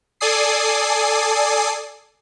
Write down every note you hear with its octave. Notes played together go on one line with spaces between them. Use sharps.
A4 D5 G#5 D#6 C7